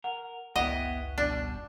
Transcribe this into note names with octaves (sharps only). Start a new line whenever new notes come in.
A#4 F#5
G#1 C#2 F#2 B3 E4 G4 D#5 F#5
B2 G3 D4